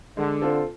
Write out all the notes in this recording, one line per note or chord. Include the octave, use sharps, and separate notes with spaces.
D3 G#3
C4 F4 A4